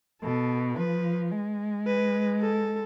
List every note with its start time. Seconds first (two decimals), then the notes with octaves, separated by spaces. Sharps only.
0.22 B2 A4
0.77 F3 B4
1.32 G#3
1.87 B4
2.41 A4